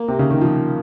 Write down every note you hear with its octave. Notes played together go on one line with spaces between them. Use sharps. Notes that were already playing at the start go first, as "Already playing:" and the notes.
Already playing: A#3
C3
C#3
D#3
F3